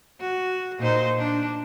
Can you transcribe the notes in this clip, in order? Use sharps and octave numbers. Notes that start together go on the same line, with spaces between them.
F#4
A#2 D#4 C5
D4